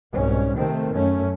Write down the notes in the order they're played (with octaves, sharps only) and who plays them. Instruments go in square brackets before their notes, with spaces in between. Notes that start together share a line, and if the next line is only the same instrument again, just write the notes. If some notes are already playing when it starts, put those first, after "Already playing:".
[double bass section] C2 G#2 B2 C#4
C3 D#3 A3 C4
F#2 A3 C#4